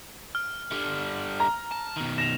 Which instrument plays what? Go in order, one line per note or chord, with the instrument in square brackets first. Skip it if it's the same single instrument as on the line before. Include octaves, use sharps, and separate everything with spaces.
[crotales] F6
[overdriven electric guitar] D3 G3
[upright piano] A#5
[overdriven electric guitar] A5
B2 D#3
[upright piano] A#6 [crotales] E7 F7